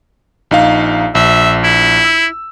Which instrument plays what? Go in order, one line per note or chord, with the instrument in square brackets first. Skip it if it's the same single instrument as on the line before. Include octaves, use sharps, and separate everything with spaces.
[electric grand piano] A#1 D#4 F5
[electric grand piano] A#1 [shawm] E5
[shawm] E4
[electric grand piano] E6